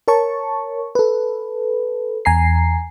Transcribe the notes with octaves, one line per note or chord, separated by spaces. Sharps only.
A#4 C#5 A5 C#6
A4 B4
E2 G#5 A#5 C7